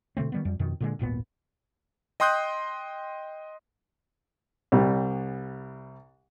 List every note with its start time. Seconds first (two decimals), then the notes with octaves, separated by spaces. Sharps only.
0.17 B2 D3 A3 C4
0.32 D#3 G3 B3
0.45 F2 G3
0.59 F2 B2 D#3
0.80 A#2 D3 G#3
0.99 D#1 G#1 A#2 B3
2.20 D#5 G5 C6 D#6 F#6 G6
4.72 C2 G3